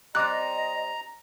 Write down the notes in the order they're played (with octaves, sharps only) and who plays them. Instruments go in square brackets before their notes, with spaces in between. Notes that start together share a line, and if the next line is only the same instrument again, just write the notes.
[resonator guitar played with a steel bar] G3 C4 [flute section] D#5 [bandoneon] A#5 [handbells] D6 F#6